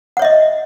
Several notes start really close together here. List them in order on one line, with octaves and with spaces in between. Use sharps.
F#5 C#5 E5 D#5